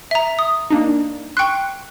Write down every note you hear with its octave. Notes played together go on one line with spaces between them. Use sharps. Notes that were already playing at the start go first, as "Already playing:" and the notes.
E5 A#5
D#6
A#3 D4 D#4
G5 C6 C#6 F#6